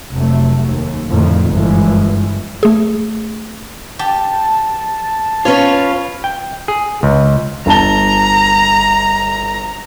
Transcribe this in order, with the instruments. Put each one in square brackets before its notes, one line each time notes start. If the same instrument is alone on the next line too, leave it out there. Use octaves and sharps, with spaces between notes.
[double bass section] F1 C3 F#3 A3
D#2
F2 A2 D3 D#3 F3 A3
G1 F#2 D3 E3 F3 G#3
[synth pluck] A3 G#4
[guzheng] G4 [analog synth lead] A5
[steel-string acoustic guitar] C#4 B4 C#5 [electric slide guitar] F4
[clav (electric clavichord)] G5
G#4
C#2
[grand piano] G1 A5 G7 [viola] A#5